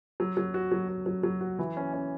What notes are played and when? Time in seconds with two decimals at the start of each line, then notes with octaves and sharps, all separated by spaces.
0.20 F#3
0.37 F#3
0.54 F#4
0.72 F#3
0.88 F#4
1.06 F#3
1.23 F#3
1.41 F#4
1.59 E3
1.77 C#4
1.93 C#4